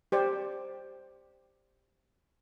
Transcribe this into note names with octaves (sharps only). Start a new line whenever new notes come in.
G4 C5 D5